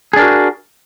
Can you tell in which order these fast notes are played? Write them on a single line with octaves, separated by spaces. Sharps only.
G#4 D4 A#4 F#4